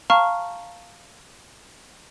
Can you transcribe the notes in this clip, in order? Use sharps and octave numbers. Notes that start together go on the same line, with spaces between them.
F5 A5 A#5 C#6 F6